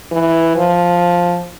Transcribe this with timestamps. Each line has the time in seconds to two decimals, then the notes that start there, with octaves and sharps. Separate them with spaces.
0.12 E3
0.56 F3